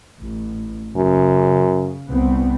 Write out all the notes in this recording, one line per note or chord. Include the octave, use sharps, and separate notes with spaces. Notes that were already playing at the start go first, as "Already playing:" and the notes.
A1
F#2 C#3
C2 B3 C4